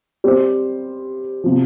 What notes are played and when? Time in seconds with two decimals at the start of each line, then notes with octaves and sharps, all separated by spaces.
0.24 G3 C4 G4 C5
1.44 C3 F3